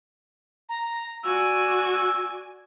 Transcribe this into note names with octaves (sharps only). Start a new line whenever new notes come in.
A#5
F#4 D5 G#5 E6